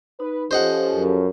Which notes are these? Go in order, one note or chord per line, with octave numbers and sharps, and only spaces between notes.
D#4 B4
F3 C#4 G4 A4 C5 D#5 F#5
F#2